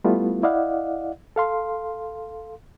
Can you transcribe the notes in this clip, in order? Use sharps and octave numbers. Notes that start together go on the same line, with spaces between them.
G3 A3 B3 E4 F4
E4 D5 D#5 F5 F#5
A4 F5 C6